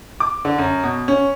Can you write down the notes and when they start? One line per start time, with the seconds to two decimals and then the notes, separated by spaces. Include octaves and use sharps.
0.20 D6
0.45 D3
0.58 F#2
0.83 B2
1.08 C#4